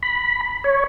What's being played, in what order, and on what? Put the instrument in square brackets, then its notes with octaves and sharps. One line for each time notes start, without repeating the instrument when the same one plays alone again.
[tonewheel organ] B5
C#5